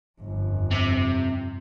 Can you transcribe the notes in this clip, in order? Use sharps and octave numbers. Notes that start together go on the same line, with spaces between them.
G1 F2
C3